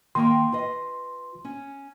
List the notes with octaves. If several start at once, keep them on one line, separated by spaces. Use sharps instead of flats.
D#3 A#3 G5 C6
F4 B4 D#5
C#4